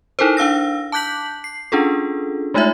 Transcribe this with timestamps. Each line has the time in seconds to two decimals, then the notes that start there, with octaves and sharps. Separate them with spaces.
0.19 D#4 E4 A4 A#4 C5
0.37 D4 F5 E6 A#6
0.92 A5 D6 F#6 G6 B6 F#7
1.44 C7
1.72 C#4 D4 F4 G#4 A4
2.54 G#3 A3 D#4 F4 C#5 E5